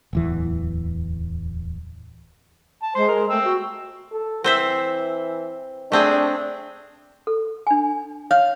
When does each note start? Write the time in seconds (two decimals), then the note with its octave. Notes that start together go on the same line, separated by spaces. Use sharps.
0.13 D1 E2 E3
2.83 A5
2.95 G#3 C5 C6
3.08 A#4
3.30 A3 G5 E6
3.44 F#4
4.12 A4
4.44 E3 C4 C5 E5
5.92 A3 C4 D4 G#4
7.27 A4
7.67 D4 G#5
8.31 C#5 F5